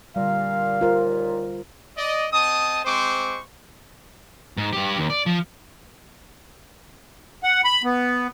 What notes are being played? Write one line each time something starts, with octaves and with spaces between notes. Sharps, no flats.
A#2 D3 G3 F5
D#2 A#2 F4 A#4 C5
D5 D#5
C4 D#5 A5 D#6
G#3 C4 C5 C#6 D6
G#2
G2 G4
D#2
D5
F3
F#5
B5
B3